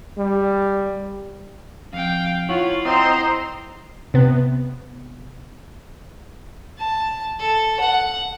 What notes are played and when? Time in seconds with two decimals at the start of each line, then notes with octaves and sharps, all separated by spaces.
0.18 G3
1.93 F2 F5 G5
2.49 E4 F4 C#5 F#5
2.85 C4 C5 D#5 A#5 C6
4.14 C3 B3
6.78 A5
7.39 A4
7.80 F#5